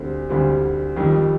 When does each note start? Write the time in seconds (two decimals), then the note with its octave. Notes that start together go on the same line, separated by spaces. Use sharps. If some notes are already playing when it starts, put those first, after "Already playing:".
Already playing: D2 D3 G3 C4
0.30 D2 D3 G3 C4
0.96 F2 D#3 G3